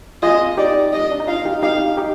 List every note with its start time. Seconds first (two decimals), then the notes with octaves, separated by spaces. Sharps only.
0.23 F4 G#4 D#5
0.57 D#4 G4 D5
0.93 D#5
1.12 D4
1.20 D#4
1.27 D4 F4 F5
1.45 D#4 G4
1.63 D#4 G4 F5
1.97 D#4 G4